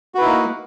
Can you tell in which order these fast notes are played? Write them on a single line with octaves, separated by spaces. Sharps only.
F#4 B4 E4 D#4 A#3